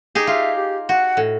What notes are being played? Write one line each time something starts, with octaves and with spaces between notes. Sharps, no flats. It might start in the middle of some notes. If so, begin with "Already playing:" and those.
D#4 G4 G#4
F4 E5
G4
F#4 F#5
A2